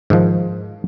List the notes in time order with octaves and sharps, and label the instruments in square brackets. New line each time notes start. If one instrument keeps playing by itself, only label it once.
[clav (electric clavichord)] G#2 D#3 F3